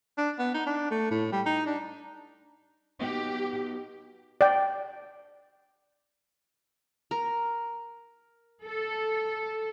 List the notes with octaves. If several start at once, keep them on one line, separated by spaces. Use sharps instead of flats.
D4
B3
D#4
D4
A3
A2
G3
D#4
D4
B3 D#4 F#4 G4
D5 G5
A#4
A4